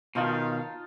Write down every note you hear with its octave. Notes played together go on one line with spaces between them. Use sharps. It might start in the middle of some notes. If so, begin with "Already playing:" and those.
B2 D#3 C#4 D#4 F4 F5 A5